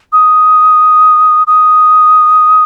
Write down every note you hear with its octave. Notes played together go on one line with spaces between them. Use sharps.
D#6
D#6